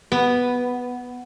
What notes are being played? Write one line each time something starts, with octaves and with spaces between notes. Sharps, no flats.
B3